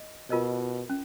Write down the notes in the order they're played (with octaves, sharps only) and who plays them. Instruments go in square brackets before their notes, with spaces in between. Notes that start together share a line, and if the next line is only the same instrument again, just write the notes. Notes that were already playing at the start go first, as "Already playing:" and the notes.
Already playing: [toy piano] D#5
[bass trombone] B2 [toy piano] F4 A#4 D#5
[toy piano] C#4